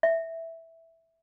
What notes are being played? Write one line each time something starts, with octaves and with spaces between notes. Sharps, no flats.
E5